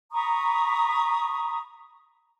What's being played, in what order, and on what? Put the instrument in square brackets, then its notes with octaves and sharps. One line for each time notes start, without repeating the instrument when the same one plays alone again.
[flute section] A#5 B5 C#6 D#6